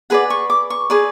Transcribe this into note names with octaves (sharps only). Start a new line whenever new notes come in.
G#4 B4 D5 F#5
C#6
D6
C#6
G#4 B4 D5